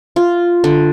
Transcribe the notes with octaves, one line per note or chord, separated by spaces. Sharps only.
F4
D3